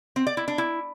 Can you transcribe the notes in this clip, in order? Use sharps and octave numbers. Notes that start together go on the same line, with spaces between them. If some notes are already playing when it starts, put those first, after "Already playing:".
C4
D5
E4
D4
E4